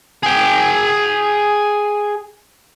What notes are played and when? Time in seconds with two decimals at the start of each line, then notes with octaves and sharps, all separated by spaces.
0.23 G#4 G5